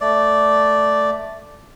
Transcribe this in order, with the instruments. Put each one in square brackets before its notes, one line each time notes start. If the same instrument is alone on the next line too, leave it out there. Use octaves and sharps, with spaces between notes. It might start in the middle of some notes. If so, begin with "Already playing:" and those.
[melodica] A3 D5